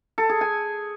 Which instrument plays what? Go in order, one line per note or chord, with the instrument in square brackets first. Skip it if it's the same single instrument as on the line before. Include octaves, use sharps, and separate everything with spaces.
[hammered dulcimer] A4
G#4
G#5